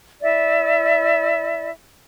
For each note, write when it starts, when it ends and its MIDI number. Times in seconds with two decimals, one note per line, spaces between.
0.22 1.70 64
0.22 1.70 74
0.22 1.70 76